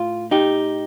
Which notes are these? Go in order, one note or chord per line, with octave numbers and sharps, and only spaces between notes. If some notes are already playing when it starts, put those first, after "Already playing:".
Already playing: A2 F4
D#4 G4